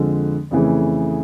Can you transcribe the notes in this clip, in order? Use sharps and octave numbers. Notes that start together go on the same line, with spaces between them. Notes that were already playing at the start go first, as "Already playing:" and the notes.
Already playing: F2 D3 F3 G#3
F2 C#3 E3 A3